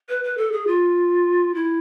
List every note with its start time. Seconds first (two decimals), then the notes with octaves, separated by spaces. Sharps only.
0.09 B4
0.24 B4
0.37 A4
0.52 G#4
0.67 F4
1.55 E4